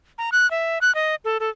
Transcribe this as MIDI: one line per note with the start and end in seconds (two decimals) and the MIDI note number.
0.18 0.30 82
0.32 0.49 90
0.51 0.78 76
0.81 0.94 90
0.95 1.15 75
1.25 1.38 69
1.40 1.49 69